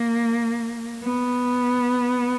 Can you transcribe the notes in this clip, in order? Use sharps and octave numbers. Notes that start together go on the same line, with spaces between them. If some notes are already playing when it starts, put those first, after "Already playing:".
Already playing: A#3
B3